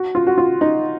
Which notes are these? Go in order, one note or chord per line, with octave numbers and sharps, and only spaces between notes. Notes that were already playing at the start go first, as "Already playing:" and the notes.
Already playing: F#4
F4
F#4
F4
D#4